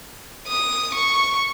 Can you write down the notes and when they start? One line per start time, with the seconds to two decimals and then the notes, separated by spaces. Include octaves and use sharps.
0.48 D#6
0.95 C#6